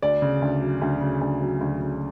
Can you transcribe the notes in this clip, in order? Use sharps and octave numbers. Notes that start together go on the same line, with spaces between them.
D2 D5
C#3
D2
F#3
D2
C#3
D2
F#3
D2
C#3